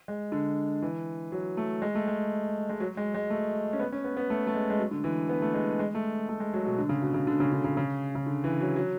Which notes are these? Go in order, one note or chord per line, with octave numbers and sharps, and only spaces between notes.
G#3
D3
E3
F#3
A3
G#3
A3
G#3
G#3
F#3
G#3
G#3
A3
C#4
B3
C#4
B3
B3
A3
A3
G#3
G#3
F#3
D3
E3
B3
A3
G#3
G#3
A3
A3
G#3
F#3
B2
D3
C#3
B2
C#3
D3
C#3
D3
C#3
C#3
C#3
D3
E3
F#3
F#3